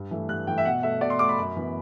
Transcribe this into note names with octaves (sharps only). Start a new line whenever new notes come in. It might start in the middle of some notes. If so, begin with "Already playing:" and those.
Already playing: G2
E3 A3
G2 F#6
E3 A3 G5
E5
B2 F#5
A3 E5
B2 D5
C6
A3 D6
B5
F#2
E3 B3